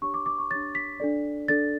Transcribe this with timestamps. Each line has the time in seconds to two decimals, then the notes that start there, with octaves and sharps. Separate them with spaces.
0.02 D4 G4 C#5 C#6
0.14 D6
0.26 D6
0.39 C#6
0.50 D4 G4 C#5 A6
0.75 B6
1.00 D4 A4 D5
1.48 D4 A4 D5 A6